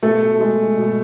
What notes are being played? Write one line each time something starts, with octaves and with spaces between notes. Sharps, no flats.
B2 A3 A4
G#3
B2